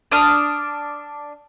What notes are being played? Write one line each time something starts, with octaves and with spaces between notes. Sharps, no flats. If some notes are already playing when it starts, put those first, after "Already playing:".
D4 D#6 F6